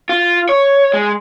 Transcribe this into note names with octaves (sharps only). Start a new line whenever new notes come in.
F4
C#5
G#3